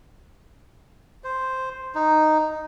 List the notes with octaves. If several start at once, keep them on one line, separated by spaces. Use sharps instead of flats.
C5
D#4